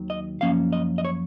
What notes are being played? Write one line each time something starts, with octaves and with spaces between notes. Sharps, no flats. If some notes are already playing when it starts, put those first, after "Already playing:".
Already playing: D#2 D#3 F#3
D#5
F#2 F3 A#3 C#4 F5
D#5
D#5
C#5